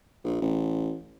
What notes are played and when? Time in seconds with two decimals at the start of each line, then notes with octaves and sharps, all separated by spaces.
0.24 A#1
0.41 A1